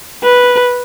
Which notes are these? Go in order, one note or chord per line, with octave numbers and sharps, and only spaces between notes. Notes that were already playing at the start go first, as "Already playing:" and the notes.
B4